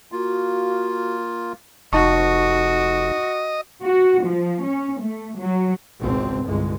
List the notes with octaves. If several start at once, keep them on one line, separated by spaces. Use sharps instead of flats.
A#3 F4 F#4
F1 D#4 F#4 D#5 A5 C#6
F#4
F3
C#4
A3
F#3
G#1 C#2 B2 C4
G1 C2 G#3